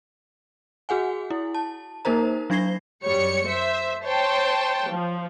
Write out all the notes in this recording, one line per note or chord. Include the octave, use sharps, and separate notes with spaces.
F#4 G#4 F#5 G#5
E4
A5
A#3 D#4 A#4 C5 A#5
F#3 D4 G#6 A#6 C7 G7
F#2 G3 C#5 C#7
C5 E5
C5 C#5 G5 A5
F3